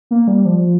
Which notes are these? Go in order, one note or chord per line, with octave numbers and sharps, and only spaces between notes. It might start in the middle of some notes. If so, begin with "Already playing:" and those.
A#3
G3
F3